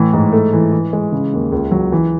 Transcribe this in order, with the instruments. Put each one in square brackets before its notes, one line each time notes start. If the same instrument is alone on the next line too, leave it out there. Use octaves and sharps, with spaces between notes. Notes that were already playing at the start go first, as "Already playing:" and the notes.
Already playing: [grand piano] A2 E3
G#2
A3
E3
E3
G#3
C#3
D#2
C#2
F#3
E3